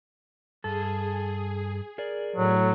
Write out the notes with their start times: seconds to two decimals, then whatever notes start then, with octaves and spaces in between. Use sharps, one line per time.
0.64 G2 G#4 A4
1.98 G#4 A#4 D5
2.36 A2 F#3 A3